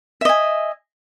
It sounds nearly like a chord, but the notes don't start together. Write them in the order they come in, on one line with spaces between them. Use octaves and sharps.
E5 D#5 G#5